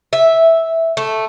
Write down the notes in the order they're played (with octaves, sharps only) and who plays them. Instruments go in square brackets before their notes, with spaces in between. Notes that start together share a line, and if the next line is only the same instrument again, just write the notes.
[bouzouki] E5
A3